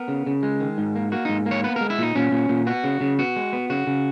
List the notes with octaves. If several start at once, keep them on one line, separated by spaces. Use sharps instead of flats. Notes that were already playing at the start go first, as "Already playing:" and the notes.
Already playing: B3 A#4
C#3
C#3
G#3
D#3
G#2
A#3
A#3 F#4
G#2 D#4
A#3
C#5
B3 B4
G#3 A#4
E4
A#2 D#4
A#2 C#4
A#2
A#2
B3 F#4
C#3
C#3
B3 F#4
G#3
B3
C#3 F#4
C#3